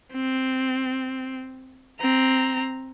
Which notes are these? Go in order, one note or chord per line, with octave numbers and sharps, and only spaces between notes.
C4
C4 A#5